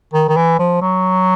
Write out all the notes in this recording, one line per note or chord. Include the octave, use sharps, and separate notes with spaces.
D#3
D#3
E3
F3
F#3